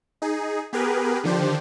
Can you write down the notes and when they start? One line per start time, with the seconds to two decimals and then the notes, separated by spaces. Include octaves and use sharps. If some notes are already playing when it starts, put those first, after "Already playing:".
0.22 D#4 G#4
0.73 B3 G4 G#4 A#4 B4
1.24 D3 D#3 F3 D4 G4 C5